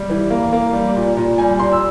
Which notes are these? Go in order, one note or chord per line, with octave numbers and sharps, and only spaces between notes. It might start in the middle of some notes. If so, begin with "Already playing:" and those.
Already playing: G3
E3
A#3
A#3
G3
A#2
A#2
G3 G#5
A#2 C6
E6